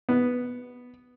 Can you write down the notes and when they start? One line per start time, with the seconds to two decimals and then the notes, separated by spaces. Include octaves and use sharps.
0.09 B3